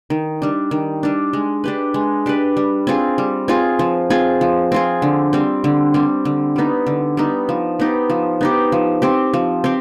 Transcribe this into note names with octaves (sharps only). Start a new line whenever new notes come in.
D#3
G3 D4
D#3
G3 D4
G#3
D4 G4 B4
G#3
D4 G4 B4
G3
C4 F4 G#4
G3
C4 F4 G#4
F3
C4 F4 G#4
F3
C4 F4 G#4
D3
G3 C4
D3
G3 C4
D3
G3 B3 D#4
D3
G3 B3 D#4
F3
B3 D#4 G4
F3
B3 D#4 G4
F3
C4 G4
F3
C4 G4